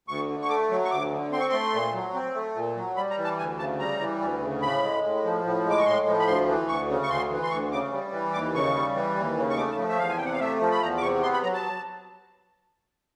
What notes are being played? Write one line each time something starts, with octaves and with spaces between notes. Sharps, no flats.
D2 C#6
D3
C#6
A3 D6
F#3
C#6
D2 D6
D3
C4 C6
C#6
A3 C6
A#2
F#3
C4
A3
A#2
F#3
G3 B5
A#5
E3
A5
D2 G#5
C#3 A5
G3 A#5
E3
D2
C#3
A2 B5
G#3
A2
F3
A2
G#3
D6
C#6
A2 C6
F3
B5
D2 C6
E3
D2 C#6
C#3
C#6
D2 C6
E3
C6
D2 C#6
C#3 D6
G3
E3
D#2 D6
C#3 C#6
G3
E3
D#2
C#3
C#6
A3 D6
A5
F3
E5
E2 F5
G#5
C3 G5
F#5
F5
A3 E5
F3
B5
E2 A#5
D6
C3 C#6
B3 C6
B5
F#3 A#5
A5